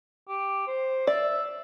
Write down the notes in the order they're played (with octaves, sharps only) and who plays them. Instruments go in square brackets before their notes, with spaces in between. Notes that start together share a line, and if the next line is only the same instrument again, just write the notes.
[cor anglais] G4
C5
[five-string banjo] D5 [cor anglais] E5